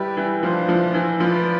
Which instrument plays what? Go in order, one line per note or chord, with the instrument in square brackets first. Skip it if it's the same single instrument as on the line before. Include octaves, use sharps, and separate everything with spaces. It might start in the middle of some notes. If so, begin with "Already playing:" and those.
Already playing: [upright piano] G3 E4 [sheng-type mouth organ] G4 B4 D5
[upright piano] E3
[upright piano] F3 [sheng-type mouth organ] D4 F4 C5
[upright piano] F3
E3
[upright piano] F3 [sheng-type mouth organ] F4 B4 D5